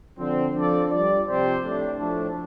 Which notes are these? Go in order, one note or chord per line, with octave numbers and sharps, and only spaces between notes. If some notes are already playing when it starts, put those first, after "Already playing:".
D3 F3 C4
F3 D4 A4 D5
G3 F4 D5
C3 F3 C4 G4 C5
A2 A3 D4
A2 F3 A3 D4